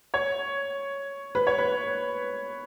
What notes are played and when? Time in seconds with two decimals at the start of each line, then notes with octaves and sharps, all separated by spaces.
0.14 C#5
1.35 B4
1.47 C#5
1.58 B4